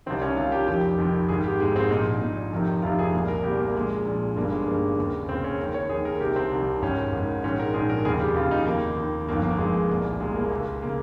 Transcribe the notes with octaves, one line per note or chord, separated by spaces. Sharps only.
C2 C3 D#3 C4
C#4
C2 C3 D#3 F4
G4
F1 F2 D#3 G4
F1 F2 D#3
G#1 G#2 D#3 G#4
G4
G#1 G#2 D#3 G#3
C4
A#1 A#2 D#4
A#1 A#2
F1 F2 C3 D#3
F1 F2 C3 D#3 F4
G#4
C2 A#2 G#4
A#4
C2 A#2 G4
A#3
A#1 A#2 G#3
A#1 A#2
G1 G2 D#3 A#3
G#3
G1 G2 D#3 A#3
D#2 C#3
D#2 C#3 C4
C#4
D#2 D#3 A#4
C#5
D#2 D#3 G#4
A#4
C2 C3 D#3 G4
C4
C2 C3 D#3
G#1 G#2 D#3 C#4
G#1 G#2 D#3
A#1 G#2 D#3 C#4
A#4
A#1 G#2 D#3 G#4
A#4
F1 D#2 C#3 G#4
G4
F1 D#2 C#3 F4
D#4
D#2 D#3 A#3
D#2 D#3
G1 F2 D#3 A#3
A#3
G1 F2 D#3 G#3
C2 A#2
C2 A#2 G#3
A#3
C#2 C#3
A#3
C#3